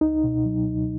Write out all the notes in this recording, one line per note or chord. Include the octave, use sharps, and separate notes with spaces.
C#2 D#4
B2
F#3
C#2